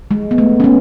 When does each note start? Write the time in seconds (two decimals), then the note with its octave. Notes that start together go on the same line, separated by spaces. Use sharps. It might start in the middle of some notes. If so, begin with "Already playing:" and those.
0.11 G#3
0.31 B3
0.38 A3
0.60 C#4
0.64 G#3 B3